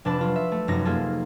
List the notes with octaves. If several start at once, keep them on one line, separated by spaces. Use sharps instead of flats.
F1 D4 B4 A5
F#3 F4
E5
A3
F1 F#2 D#4 A#5 A#6
A#3 F4 G#4 A4